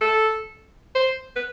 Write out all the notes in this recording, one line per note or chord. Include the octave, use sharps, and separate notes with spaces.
A4
C5
B4